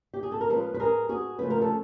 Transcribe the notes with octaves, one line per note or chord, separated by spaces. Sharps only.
G4
G#4
A4
A#4
F3 G#3 C#4 F4 A4 B4
B4
G#4 A#4
F#4 G#4
C#3 F3 A3 C#4 B4
A#4
A4